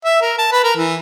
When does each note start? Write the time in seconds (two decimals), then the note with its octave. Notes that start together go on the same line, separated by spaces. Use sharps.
0.05 E5
0.21 A#4
0.38 A5
0.52 B4
0.64 A#4
0.77 E3